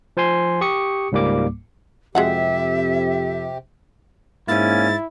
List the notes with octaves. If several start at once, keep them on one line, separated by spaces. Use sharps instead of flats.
F3 C5 G#5 C6
G4 C#6 D#6 C#7
C#2 G#2 G3 A#3 D6
F2 C3 G#3 F#4 G4 E5 F#5
G#2 A#3 C#4 E4 A6